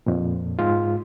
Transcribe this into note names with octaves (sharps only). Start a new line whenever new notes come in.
F2 A#2
G#2 G#3 F4